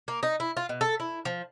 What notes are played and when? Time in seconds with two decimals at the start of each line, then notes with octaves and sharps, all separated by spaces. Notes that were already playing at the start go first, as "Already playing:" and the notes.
0.08 A#3
0.23 D#4
0.40 E4
0.57 F4
0.69 B2
0.81 A4
1.00 E4
1.25 F3